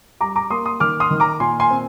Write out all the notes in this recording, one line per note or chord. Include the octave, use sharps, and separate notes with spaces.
G3 A#5 D6
A#5 D6
A#3 C6 D#6
C6 D#6
D#3 D6 F6
C6 D#6
D#3
A#5 D6
A#2 G#5 C6
G#5 C6
C4